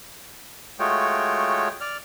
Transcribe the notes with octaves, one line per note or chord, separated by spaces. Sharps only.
G#3 A3 F4 F#4 C#5 G5
D5 F6